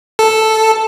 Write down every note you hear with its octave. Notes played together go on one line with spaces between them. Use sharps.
A4